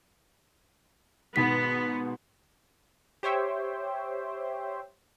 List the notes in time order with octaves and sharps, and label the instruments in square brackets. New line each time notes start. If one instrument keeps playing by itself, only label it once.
[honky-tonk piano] G#2 B2 D#3 [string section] B3 [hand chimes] B6
[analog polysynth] G4 C5 C#5 E5 G5